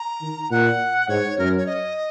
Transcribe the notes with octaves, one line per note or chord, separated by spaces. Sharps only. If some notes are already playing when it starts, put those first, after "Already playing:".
Already playing: A#5
D#3
A#2 F#5
G#2 C#5
F#2 A#4
C#5
D#5